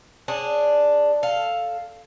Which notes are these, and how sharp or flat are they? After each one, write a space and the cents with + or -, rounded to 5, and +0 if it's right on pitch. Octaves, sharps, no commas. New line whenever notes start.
D4 +0 G#4 +0 C#5 -25
A4 +0 F5 +0